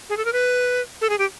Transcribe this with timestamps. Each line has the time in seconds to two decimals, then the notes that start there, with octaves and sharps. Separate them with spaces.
0.10 G#4
0.17 A4
0.25 A#4
0.33 B4
1.01 A4
1.10 G#4
1.19 G4